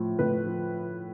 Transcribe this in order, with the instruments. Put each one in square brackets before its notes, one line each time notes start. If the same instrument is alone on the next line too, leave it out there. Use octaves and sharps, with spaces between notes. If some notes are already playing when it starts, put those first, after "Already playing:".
Already playing: [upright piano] A2 F3
A2 B4
F3